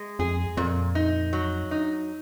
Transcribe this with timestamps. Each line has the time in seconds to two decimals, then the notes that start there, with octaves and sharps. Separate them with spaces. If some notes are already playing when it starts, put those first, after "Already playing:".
Already playing: G#3
0.19 F2 G#4
0.57 F2 A#2
0.95 D#4
1.33 F#3
1.71 D#4